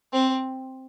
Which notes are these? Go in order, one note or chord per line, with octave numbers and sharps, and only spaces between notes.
C4